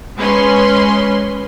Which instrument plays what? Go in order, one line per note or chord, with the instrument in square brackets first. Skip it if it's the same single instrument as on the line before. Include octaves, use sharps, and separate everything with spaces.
[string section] G#3 C#4 B4 C6